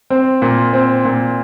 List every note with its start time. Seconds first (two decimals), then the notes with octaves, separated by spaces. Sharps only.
0.10 C4
0.42 A#2
0.73 C4
1.05 A#2